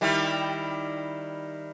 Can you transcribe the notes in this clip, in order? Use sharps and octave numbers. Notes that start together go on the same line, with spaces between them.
D#3 G3 E4